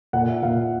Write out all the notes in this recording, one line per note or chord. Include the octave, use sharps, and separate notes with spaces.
A#2 F#5
E5
A#2 F5